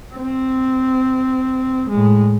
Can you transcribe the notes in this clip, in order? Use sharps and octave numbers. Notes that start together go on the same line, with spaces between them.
C4
A2 G#3